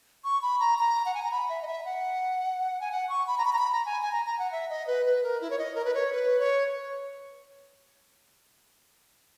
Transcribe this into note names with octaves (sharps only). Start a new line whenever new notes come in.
C#6
B5
A#5
A#5
F#5
G#5
A#5
B5
E5
D#5
E5
F#5
G#5
F#5
C#6
B5
A#5
B5
A#5
B5
A#5
G#5
G#5
A#5
A#5
F#5
E5
D#5
B4
B4
A#4
E4
C#5
D#5
A#4
B4
C#5
B4
C#5